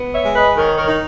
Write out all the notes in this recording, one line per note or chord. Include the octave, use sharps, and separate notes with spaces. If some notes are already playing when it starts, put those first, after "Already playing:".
Already playing: B3
C#5 E5
G#3
B4 D#5
D#3 A#4 C#5
A#4 C#5
D#4